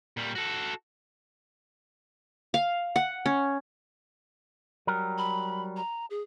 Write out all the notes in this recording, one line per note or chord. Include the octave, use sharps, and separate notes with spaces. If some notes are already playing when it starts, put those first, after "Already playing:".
A#2 G3
F#4 A4
F5
F#5
C#4
F#3 G3 A#4
B5
A#5
G#4